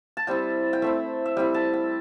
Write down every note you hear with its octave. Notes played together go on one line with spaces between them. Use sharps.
A5
G3 C4 E4 G5
G5
A3 C4 E4 E5
E5
G3 C4 E4 G5
A5
G5